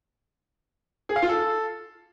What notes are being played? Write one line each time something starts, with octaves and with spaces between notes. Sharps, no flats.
G#4
F5
F4
A4